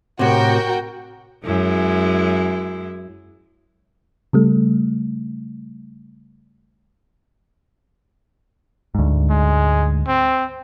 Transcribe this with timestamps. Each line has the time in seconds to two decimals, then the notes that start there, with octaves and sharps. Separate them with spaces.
0.19 A2 C3 F#4 A#4 G5
1.45 F#2 G#3 E4
4.33 C#3 G3 A3
8.95 D2 G#2
9.30 G#3
10.07 C4